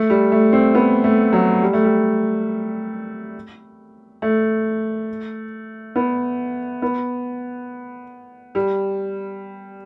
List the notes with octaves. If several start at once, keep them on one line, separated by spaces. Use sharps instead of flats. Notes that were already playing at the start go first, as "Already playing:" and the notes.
Already playing: A3
G3
A3
C4
B3
A3
F#3
G3
A3
G3
A3
B3
B3
G3